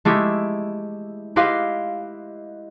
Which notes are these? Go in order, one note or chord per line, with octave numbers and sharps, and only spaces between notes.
G#3 A3 E4 G4
E4 G4 B4 D#5 F5 C6